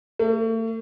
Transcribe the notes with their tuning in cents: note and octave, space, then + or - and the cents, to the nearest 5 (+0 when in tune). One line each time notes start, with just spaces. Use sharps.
A3 +40